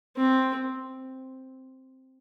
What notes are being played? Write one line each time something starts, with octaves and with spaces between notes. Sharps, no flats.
C4